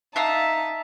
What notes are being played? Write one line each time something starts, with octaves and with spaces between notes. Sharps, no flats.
D#4 E5 F5 A5 A#5